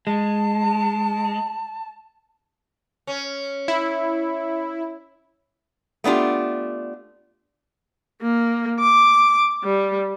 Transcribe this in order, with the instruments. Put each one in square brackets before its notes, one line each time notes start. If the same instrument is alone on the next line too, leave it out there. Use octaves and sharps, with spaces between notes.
[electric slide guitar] G#3 [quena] A5
[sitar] C#4
[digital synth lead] E4
[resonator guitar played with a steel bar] A3 B3 D4 F4 G4
[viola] A#3
D6
G3